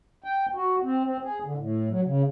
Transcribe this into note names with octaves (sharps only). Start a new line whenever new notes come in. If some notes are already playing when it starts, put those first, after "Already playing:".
G5
F#4
C4
C4
G#4
D3
A2
F#3
C#3